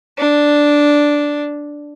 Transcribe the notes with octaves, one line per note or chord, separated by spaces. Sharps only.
D4